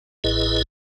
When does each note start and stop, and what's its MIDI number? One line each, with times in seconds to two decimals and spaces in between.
0.24 0.62 33
0.24 0.62 45
0.24 0.62 64
0.24 0.62 68
0.24 0.62 71
0.24 0.62 75